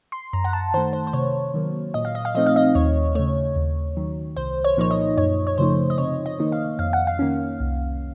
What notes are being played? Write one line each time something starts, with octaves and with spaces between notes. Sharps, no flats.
C6
F#2 A#5
F#5
A5
D#3 A3 C5
C5
C5
C3 C#5
D#3 F#3 A#3
A#2 D#5
F5
D#5
F5
F3 A3 C4 D#4 D#5
F5
D#5
D#2 C#5
C#3 A3 C#5
D#2
D#3 F#3
C2 C5
C#5
A#2 F3 A#3 D#4 C#5
D#5
F#2 C#5
C#5
C#3 F3 A3 D#4 C5
D#5
C3 C#5
D#5
D#3 A#3 D#4
F5
F2 F5
F#5
F5
D#3 A#3 C#4
C2